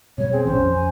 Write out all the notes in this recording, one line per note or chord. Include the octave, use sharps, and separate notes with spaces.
B2 G3 C#5
C4 G#4
A#1 E3 C#4 C5
F2
G#5